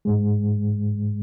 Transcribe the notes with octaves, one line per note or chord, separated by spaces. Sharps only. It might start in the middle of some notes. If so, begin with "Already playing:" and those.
G#2 G#3